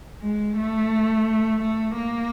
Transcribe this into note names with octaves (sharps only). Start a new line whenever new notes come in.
G#3
A3
A3
A#3